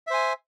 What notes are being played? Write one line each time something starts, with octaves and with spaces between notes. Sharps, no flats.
C5 E5 G#5